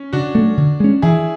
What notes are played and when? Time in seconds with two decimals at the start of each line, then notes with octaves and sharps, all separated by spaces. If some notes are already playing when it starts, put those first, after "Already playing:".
Already playing: C#4
0.13 C#3 D4 F#4
0.35 F#3 A3
0.57 D3
0.80 G#3 C#4
1.02 E3 E4 G#4